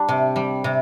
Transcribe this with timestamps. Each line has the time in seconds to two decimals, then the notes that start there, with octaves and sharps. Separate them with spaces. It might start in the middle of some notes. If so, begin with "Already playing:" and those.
Already playing: G3 D4
0.09 C3
0.36 G3
0.64 C3